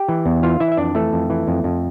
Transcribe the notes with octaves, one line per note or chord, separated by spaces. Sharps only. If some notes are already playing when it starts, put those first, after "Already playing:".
Already playing: G4 G5
E3
E2
E3 F4 F5
E3 E4 E5
E5
F2 D4 D5
E3 A3 A4
F2
E3
F2
F2